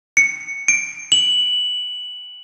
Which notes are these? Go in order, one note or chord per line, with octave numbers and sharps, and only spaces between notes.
C#7
D7
F#7